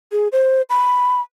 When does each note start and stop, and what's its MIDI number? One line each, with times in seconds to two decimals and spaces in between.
0.12 0.28 68
0.32 0.62 72
0.70 1.21 83